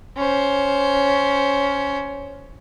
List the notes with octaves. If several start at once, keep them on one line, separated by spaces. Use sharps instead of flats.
C#4 C5